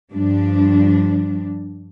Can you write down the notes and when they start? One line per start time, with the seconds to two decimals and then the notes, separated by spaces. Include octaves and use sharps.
0.12 G2 F3 G3 D4